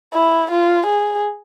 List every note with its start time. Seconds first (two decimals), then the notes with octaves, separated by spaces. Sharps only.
0.14 E4
0.51 F4
0.87 G#4